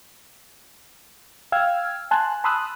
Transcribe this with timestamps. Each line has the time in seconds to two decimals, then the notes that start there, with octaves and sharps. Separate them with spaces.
1.52 F5 G5 E6 F6 G#6
2.11 G#5 A5 C6 F#6
2.44 A5 B5 C6 D#6 E6 F#6